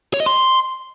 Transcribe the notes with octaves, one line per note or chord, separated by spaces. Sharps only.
C#5
D#5
C6